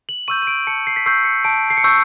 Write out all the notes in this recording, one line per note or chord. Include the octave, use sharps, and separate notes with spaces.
F#7
C#6 E6 G6 D#7
D#7
D7
A5 C#7
C7
B6
C#6 E6 G6 C7
C#7
A5 D7
C7
C#7
C#6 E6 G6 C7